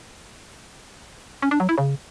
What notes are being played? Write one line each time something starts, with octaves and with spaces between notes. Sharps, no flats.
C#4
D4
F#3
E4
C#3